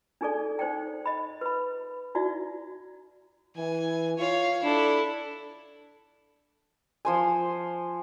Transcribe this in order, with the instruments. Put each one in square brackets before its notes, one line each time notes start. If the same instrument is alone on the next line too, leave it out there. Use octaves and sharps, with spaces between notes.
[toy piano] D4 D#4 G#4 A4 D5
D#4 C5 D5 G5
D#5 B5
B4 B5
D#4 E4 F#4 D5 E5
[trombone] E3 [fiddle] G#5
[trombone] F4 [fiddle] C#5 F5
[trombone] D4 [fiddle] E4 A4
[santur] F3 C5 G#5